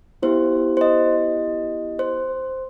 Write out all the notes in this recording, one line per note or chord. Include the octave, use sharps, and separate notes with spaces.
B3 E4 G4 C5
C5
D#5
C5